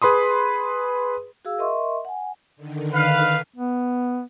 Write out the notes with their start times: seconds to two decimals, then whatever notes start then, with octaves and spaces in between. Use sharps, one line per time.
0.02 G#4 B4 B5 C6 D#6
1.45 F#4 G#4 F5 E6
1.58 A#4 D#5 E5 C6 C#6
2.05 F#5 G#5
2.56 D3 D#3
2.94 B4 F5
3.56 B3